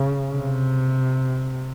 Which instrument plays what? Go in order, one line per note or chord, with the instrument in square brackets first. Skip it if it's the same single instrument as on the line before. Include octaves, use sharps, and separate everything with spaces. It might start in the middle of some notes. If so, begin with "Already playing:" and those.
Already playing: [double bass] C#3
C3